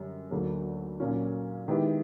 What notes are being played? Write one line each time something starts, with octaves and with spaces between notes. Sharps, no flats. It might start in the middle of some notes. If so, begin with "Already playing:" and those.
Already playing: F#2 D3 G3
D2 D3 F#3 A#3
A#2 F#3 A#3 C#4 F4
D#3 G#3 B3 E4 G4